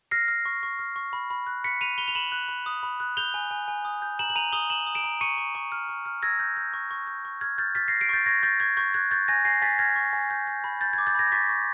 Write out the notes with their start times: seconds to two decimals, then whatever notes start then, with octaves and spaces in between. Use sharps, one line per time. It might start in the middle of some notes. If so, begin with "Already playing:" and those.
0.11 F6 A#6 C7
0.28 F6
0.45 C#6
0.63 C#6
0.79 F6
0.96 C#6
1.13 B5
1.30 B5
1.47 F#6
1.64 B5 B6 C#7
1.81 B5 D#7 F7
1.98 B5 F7 G7
2.08 F7
2.15 B5 E7 F#7
2.32 F#6
2.48 B5
2.66 D#6
2.83 B5
3.00 F#6
3.17 G6 F7 G7
3.34 G#5
3.51 G#5
3.68 G#5
3.85 D#6
4.02 G6
4.19 A#5 E7 F#7
4.30 F#7
4.36 A#5 D#7 F7
4.53 D#6 F7 G7
4.70 A#5 E7 F#7
4.87 D#6
4.95 D7 E7
5.04 A#5
5.21 C#6 C#7 D#7
5.38 C#6
5.55 C#6
5.72 F6
5.89 C#6
6.06 F6
6.22 E6 G#6 A#6
6.39 G6
6.57 G6
6.73 C#6
6.91 C#6
7.07 G6
7.25 C#6
7.41 F6 G#6
7.58 F6 G6 A6
7.75 F6 A6 B6
7.88 A#6 C7
7.93 F6
8.01 C7 D7
8.09 C#6 G6 A6
8.26 C#6 G#6 A#6
8.43 C#6 G6 A6
8.60 C#6 G#6
8.77 C#6 G6
8.94 F#6 G#6
9.11 C#6 G6 A6
9.28 G#5 G#6 A#6
9.45 G#5 A#6 C7
9.62 G#5 A6 B6
9.79 F6 G#6 A#6
9.96 C#6
10.13 G#5
10.31 G6
10.47 G6
10.64 B5
10.81 G6 A6
10.93 G#6
10.98 D6
11.07 G6 A6
11.15 B5 G#6 A#6
11.32 C#6 A6 B6
11.49 C#6